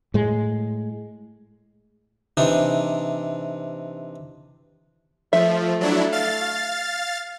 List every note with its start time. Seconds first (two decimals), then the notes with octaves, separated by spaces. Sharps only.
0.14 A2 G#3
2.37 C3 E3 D4 D#4
5.33 F3 A3 E5
5.81 F#3 D4 E4
6.12 F5 A6